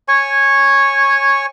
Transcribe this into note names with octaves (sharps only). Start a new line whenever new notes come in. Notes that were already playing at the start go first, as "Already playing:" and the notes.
C#5 G#5 C#6